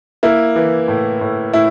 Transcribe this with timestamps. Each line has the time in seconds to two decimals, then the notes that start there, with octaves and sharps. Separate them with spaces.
0.23 A#3 E4
0.56 E3
0.88 A2
1.21 A2
1.53 A2 E4